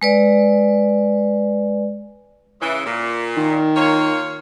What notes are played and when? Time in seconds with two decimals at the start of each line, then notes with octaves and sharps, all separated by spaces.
0.02 G#3 B4 D5
2.61 C#3 E3
2.85 A#2
3.37 D#3
3.75 A#3 F4 C#5